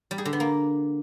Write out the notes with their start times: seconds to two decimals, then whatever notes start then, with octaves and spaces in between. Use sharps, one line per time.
0.11 G3
0.18 G#4
0.25 D3
0.33 B3
0.40 A#3